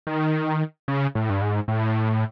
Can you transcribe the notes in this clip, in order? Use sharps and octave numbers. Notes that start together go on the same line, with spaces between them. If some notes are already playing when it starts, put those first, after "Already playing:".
D#3
C#3
A2
G2
G#2
A2